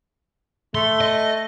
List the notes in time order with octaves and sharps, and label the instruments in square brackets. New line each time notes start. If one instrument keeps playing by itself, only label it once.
[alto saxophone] A3 [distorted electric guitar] C6
[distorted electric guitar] D#5